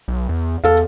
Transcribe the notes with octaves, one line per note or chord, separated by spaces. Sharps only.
B1
E2
E2 A4 F5